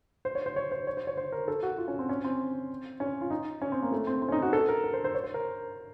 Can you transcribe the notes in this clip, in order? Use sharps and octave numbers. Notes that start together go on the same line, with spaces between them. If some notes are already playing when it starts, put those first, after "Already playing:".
C5
C#5
C5
C#5
C5
C#5
C5
C#5
C5
A#4
A4
F#4
F4
C#4
C4
C#4
C4
C#4
F4
D#4
C#4
C4
A#3
A3
C4
C4
C#4
D#4
F#4
A4
A#4
A#4
C5
C5
C#5
C5
A#4